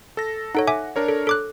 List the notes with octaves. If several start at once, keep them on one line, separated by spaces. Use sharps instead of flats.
A4 A#6
D#4 A4 C#5 F#5
E5 G#5 D6
D4 A#4 C#5
A4
A4 D6 F#6